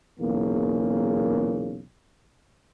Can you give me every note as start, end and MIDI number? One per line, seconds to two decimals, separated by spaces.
0.20 1.81 35
0.20 1.81 40
0.20 1.81 46
0.20 1.81 49
0.20 1.81 58